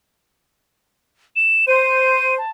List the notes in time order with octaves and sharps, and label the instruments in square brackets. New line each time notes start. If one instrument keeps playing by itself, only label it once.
[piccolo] E7
[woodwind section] C5 [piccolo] D#7
[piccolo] A5